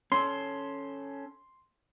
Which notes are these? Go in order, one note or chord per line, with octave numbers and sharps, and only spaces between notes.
C#4 A4 C6